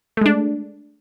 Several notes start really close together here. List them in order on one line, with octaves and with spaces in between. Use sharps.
A3 G#3 D4